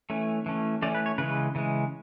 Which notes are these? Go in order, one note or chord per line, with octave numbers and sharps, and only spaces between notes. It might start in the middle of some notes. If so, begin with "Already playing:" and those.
E3 A3 C#4
E3 A3 C#4
E3 A3 C#4 D5
B4
C#5
C#3 E3 G#3 B4
C#3 E3 G#3